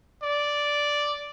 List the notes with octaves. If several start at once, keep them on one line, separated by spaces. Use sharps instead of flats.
D5